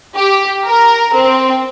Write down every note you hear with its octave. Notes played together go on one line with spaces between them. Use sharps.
G4
A#4
C4